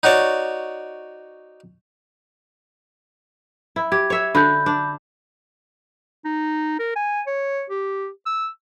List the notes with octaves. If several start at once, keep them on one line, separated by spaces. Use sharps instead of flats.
D#4 F#4 C#5 D5
E4
G4 G#6
C#5 E5
D3 F#4 B5 G6
D4
D#4
A#4
G#5
C#5
G4
E6